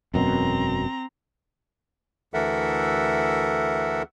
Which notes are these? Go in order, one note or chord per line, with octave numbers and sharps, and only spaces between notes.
E1 F#2 B2 C4 A#5
D2 E3 A4 A#4 E5 F#5